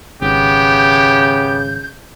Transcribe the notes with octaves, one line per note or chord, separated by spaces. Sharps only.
G#1 C#3 B3 G4 G6